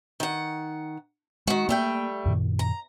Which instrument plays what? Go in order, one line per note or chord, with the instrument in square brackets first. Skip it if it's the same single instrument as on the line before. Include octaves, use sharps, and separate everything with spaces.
[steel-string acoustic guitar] D#3 F#5
[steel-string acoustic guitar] D#3 F#4 [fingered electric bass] G#3
[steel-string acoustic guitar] G3 A3 G5 [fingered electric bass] A#3
[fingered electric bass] F#2 A#2 D#3
[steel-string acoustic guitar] A#5